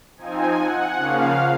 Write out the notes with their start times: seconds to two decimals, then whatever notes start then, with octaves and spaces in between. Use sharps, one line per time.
0.17 F3 C4 D#4 G#5
0.56 F#5
0.96 C#3 F3 A#3 C#4 F5